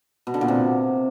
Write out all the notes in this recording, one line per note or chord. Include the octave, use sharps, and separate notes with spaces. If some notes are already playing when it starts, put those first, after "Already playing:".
B2
D3
A#2
C3